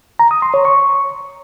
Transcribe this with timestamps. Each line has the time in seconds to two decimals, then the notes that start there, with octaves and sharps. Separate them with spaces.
0.19 A#5
0.31 D#6
0.42 C6
0.54 C#5
0.65 C#6